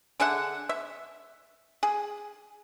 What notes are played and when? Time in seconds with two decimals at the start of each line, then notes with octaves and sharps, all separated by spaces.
0.20 D3 G#4 E5 F#5
0.69 E5
1.83 G#4